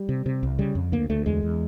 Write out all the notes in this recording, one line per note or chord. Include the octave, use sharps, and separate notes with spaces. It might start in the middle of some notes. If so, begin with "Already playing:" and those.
Already playing: G3
C3
C3
C2
C#3 G3
F2
D2 A#3
D2 A3
E2 G#3
E2